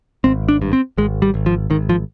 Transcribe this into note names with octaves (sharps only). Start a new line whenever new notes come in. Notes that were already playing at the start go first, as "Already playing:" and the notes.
G#1 C4
D4
G2
C4
G#1 G#3
G3
G#1
F3
G#1 D#3
F3